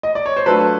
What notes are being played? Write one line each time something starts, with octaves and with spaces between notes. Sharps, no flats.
D#5
D5
C#5
C5
F#3 A3 D4 F4 A4 B4